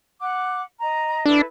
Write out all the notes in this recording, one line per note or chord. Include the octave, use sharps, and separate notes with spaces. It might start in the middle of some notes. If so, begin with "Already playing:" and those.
F#5 D6 F#6
D#5 A#5
D4 E4 A4 B4